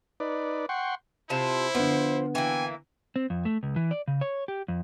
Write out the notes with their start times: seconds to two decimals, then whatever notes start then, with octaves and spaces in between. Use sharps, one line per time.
0.20 D#4 B4 D5
0.69 F#5 G5 C6 C#6
1.30 C3 E4 F4 C5 A5
1.75 D3 F3 B3
2.35 E3 A#3 G5 G#5
3.16 C4
3.30 F2
3.45 A3
3.63 C#2
3.76 E3
3.91 D5
4.08 C#3
4.21 C#5
4.48 G4
4.68 F2